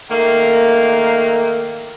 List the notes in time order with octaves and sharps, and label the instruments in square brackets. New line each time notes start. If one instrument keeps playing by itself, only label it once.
[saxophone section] D#3 A3 A#3